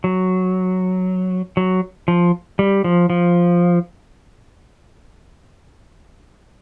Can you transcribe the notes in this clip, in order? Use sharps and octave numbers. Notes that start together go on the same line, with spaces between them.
F#3
F#3
F3
G3
F3
F3